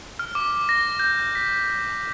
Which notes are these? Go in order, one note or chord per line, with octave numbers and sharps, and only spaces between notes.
F6
D6
A#6
G6
B6